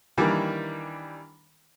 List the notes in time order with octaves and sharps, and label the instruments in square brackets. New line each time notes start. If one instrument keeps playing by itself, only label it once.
[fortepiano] D#3 E3 G3 A#3 D4